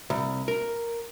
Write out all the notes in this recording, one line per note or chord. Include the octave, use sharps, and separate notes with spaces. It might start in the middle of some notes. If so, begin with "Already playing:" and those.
C2
A#4